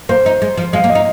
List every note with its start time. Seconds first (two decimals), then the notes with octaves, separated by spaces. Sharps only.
0.09 A#3 C5
0.26 D#4
0.42 G#3
0.57 F3
0.73 G#3 F5
0.84 A#3
0.89 D#5
0.95 D#4